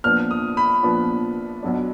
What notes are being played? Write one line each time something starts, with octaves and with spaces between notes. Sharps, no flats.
A#2 F3 B3 D4 F6
D#6
B5
A#2 F3 B3 D4
B1 B2 F#3 D4